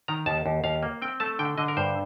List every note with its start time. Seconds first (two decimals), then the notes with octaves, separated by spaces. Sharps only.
0.08 D#3 A#5
0.26 D#2 A5
0.46 D#2
0.64 D#2 F5
0.83 A#3
1.02 C4 G5
1.20 A3 A5
1.39 D3 G5
1.58 D3 D#5
1.68 A#4
1.77 G2 C5